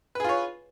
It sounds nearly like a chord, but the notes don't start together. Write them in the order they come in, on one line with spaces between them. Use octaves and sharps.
B4 G#4 F4 C#5